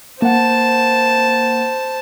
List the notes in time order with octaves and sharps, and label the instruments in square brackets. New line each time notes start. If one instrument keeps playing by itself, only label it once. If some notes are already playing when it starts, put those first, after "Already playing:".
[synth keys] A#3 F#5 [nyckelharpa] C5 A5